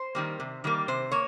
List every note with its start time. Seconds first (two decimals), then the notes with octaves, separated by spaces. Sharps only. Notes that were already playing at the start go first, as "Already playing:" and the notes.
Already playing: C5
0.15 D#3 G3 A#3
0.40 C3
0.64 D#3 G3 A#3
0.88 C3 C5
1.11 A#3 C#5